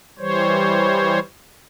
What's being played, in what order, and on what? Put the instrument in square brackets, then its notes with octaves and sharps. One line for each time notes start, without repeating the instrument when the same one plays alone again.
[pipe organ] E3 G3 C5 C#5